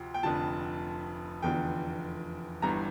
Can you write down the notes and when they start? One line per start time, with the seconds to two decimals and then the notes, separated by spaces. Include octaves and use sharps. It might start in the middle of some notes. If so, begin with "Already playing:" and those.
Already playing: D2 C3 F3
0.14 G5
0.23 F1 F2 D3 F3 A5
1.42 F1 E2 D3 F3 G5
2.62 G1 G2 E3 A#5